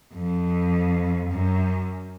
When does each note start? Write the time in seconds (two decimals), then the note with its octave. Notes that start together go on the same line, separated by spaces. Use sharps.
0.15 F2
1.31 F#2